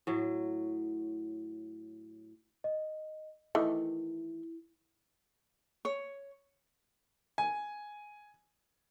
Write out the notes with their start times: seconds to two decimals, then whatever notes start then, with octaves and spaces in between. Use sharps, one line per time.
0.07 A2 F#3
2.64 D#5
3.55 D#3 E3 A3 E4
5.85 C#5
7.38 G#5